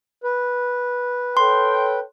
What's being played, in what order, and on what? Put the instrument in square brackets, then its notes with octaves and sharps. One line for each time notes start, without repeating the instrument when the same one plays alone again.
[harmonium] B4
[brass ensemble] A4 C#5 G5 [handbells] C6